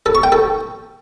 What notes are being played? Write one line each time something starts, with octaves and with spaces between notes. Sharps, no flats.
A4
C#6
G5
A4